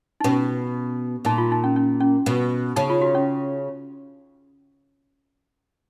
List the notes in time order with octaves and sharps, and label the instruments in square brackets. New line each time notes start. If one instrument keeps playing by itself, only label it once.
[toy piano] D#4
[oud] B2 [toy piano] C#4
[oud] A#2 [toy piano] D#4
[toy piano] F4
D#4
C#4
C#4
C#4
[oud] B2
[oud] C#3 [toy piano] D#4
[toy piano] F4
F#4
C#4